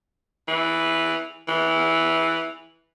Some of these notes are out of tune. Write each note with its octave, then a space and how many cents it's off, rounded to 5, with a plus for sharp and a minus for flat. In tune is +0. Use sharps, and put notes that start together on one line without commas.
E3 -5
E3 -10